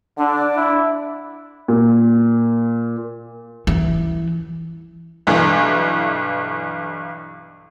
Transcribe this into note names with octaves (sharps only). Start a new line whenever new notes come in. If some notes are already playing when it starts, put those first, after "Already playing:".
D3 D4
E4
A#2
E3
B1 G2 E3